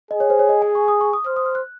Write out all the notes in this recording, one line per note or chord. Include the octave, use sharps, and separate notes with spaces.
G#4 D#5
C#5
C5
C#5
D#5
G#5
C#6
D#6
C#6
D#6
C5 F6
D#6
F6
F#6